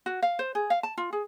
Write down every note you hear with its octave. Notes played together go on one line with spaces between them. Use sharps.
F#4
F5
C5
G#4
F5
A5
F4
G#4